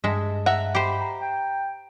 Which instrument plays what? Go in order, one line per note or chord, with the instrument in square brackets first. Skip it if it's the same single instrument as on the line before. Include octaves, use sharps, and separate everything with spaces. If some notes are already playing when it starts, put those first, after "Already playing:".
[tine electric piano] G2 D#5 A5 [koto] G#3 E5
[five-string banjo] E5 F#5 [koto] A#5
[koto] G4 C5 [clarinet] B5
[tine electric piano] A#5
[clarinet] G5